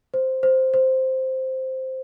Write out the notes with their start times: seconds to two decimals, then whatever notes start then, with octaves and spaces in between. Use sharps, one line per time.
0.14 C5
0.43 C5
0.74 C5